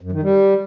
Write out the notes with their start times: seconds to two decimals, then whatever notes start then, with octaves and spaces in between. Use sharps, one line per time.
0.01 F#2
0.12 D#3
0.23 G3